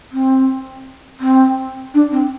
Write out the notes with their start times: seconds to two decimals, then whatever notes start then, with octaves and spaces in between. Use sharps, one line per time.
0.12 C4
1.20 C4
1.94 D4
2.12 C4